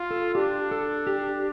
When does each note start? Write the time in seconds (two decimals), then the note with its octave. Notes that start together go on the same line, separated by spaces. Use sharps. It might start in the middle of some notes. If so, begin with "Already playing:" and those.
Already playing: F4
0.11 A4
0.35 D4 G4
0.71 A4
1.07 G4